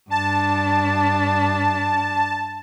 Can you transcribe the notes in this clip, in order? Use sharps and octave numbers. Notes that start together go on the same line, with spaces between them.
G2 D4 A5